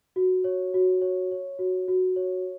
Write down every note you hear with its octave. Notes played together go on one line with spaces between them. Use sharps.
F#4
C#5
F#4
C#5
C#5
F#4
F#4
C#5